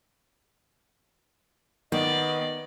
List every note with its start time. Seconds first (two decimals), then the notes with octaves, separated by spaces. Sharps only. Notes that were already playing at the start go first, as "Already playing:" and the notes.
1.92 D#3 B3 D5 D#5